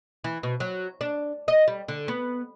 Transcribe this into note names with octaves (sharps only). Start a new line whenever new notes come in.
E3
B2
F#3
D4
D#5
G3
D3
B3